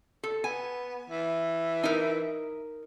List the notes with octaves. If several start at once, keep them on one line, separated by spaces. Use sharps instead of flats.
A4
B3 G#5
E3
D#4 A#4